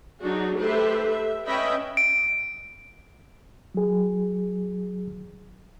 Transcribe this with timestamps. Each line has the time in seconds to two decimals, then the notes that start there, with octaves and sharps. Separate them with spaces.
0.24 F#3 D4 D#4 F#4 G#4
0.59 A3 G4 A4 B4 C5 E5
1.08 E5
1.47 C#4 B4 D#5 E5 G5 B5
1.97 D7
3.75 F#3 G#4